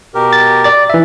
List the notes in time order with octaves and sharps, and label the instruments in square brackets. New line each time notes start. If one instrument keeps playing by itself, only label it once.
[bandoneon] B2 G4 A#4
[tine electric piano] A6
D5 A6
E3 E5